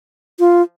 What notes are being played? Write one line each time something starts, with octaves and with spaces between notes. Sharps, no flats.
F4